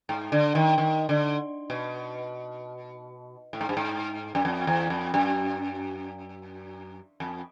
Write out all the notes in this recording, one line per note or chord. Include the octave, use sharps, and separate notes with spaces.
G#2
D3
D#3
D#3
D3
B2
A2
G#2
G2
G#2
F#2
F2
E2
F2
F#2
F2